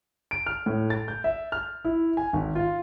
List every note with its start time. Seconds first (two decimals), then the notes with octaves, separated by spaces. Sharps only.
0.31 D7
0.46 F6
0.66 A2
0.90 A6
1.08 G6
1.24 E5
1.52 F6
1.85 E4
2.17 G#5
2.33 G#1
2.55 F4